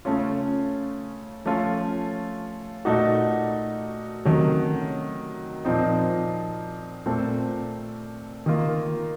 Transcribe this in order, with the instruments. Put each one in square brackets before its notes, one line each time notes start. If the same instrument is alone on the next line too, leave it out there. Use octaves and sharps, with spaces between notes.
[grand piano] C#3 A3 C#4 F4
F3 A3 C#4 F4
A#2 A3 D#4 F#4
C3 D#3 F#3 A3 C#4
A#2 F3 C4 D#4
A#2 A3 C4
D#3 A#3 F4